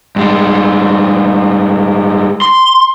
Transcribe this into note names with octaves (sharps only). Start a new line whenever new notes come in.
G2 G#3
C6